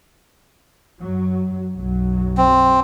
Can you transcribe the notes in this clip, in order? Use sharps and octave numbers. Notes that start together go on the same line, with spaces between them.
F#2 F#3
B1 F#2 F#3
C4